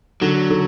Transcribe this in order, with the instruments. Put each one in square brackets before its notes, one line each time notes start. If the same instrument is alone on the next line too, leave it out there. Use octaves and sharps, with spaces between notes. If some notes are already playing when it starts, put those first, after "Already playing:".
[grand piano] D3 [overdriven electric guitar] F#3
[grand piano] D3